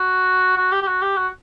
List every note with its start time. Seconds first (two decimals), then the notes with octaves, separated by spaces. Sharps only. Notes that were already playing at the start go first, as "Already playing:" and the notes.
Already playing: F#4
0.57 F#4
0.72 G4
0.82 G4
0.87 F#4
1.02 G4
1.17 F#4